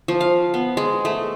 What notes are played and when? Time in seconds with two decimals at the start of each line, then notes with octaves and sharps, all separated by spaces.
0.08 F3
0.21 F5
0.54 B3
0.77 G#3
1.05 A3